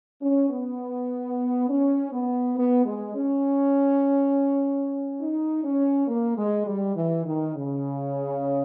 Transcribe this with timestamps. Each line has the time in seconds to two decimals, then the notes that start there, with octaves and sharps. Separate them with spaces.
0.22 C#4
0.50 B3
1.69 C#4
2.12 B3
2.57 B3
2.85 G#3
3.15 C#4
5.20 D#4
5.64 C#4
6.08 A#3
6.37 G#3
6.67 G3
6.96 E3
7.26 D#3
7.56 C#3